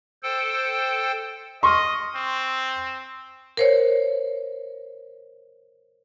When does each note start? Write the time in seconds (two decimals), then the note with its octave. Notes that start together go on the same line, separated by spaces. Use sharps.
0.23 A4 C5 G5
1.63 D#5 C6 C#6 F6
2.15 C4
3.57 A#4 C5 C#5